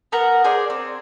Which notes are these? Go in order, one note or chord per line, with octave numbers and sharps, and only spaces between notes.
B3 A#4 F#5 A#5
G#4 C5 D5
C4